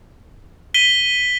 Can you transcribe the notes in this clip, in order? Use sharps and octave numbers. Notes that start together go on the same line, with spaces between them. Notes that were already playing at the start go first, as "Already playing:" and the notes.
B6 D#7 G7